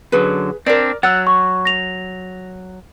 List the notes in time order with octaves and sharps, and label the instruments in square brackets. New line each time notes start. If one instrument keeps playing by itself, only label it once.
[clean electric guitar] F#2 D3 F#3 [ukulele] G#4 B4
[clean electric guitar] C4 D4 [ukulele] A#4 D5
[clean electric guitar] F#3 [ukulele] F#5 [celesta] E6 F#6 A6
[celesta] C#6
A#6 F7